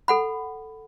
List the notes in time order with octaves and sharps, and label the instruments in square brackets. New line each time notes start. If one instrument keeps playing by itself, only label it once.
[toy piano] A4 F#5 B5